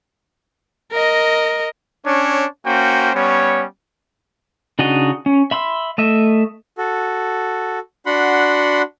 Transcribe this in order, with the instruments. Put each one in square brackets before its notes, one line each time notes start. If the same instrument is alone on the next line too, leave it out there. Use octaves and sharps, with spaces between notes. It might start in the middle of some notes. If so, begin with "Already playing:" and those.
[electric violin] A#4 D#5
[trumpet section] C#4 D4 C#5
A#3 C#4 F#4 C5 G5
G3 B3 C#4 C#5
[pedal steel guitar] C#3 D4 D#4 F#4 D#5
C#4
E5 B5 C6 E6
A3 D#5 E5
[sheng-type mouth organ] F#4 A4
D4 F#4 F#5 B5 C6